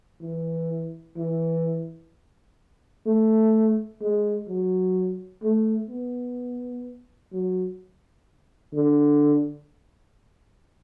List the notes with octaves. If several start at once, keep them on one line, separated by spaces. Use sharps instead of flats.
E3
E3
A3
G#3
F#3
A3
B3
F#3
D3